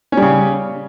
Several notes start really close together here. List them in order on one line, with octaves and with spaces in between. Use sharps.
C#4 G3 C#3